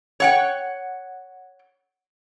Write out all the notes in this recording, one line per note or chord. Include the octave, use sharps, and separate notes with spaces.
C#5 F#5 G5